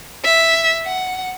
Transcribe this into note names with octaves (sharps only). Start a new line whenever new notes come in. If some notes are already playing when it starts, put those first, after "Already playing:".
E5
F#5